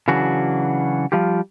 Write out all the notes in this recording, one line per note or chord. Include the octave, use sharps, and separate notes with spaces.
C#3 E3 F#3 D4 F#4
F3 G3 F4 G4